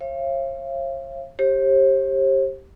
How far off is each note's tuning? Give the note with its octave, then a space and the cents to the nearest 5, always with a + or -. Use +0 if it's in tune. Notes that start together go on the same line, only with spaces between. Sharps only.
C#5 -45 F5 -40
G4 +0 C5 +45